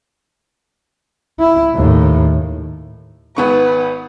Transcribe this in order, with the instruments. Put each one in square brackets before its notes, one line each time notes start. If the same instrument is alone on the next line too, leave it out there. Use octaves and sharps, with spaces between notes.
[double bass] E4
D#2 A2
[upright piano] G#1 B3 C#6 [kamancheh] B4